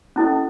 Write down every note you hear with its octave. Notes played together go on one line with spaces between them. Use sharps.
C#4 E4 A4 D#5